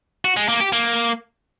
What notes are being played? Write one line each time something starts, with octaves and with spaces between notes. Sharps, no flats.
F#4
G#3
A#3
G4
A#3